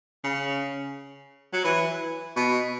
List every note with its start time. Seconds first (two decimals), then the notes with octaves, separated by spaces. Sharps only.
0.24 C#3
1.53 F#3
1.64 E3
2.36 B2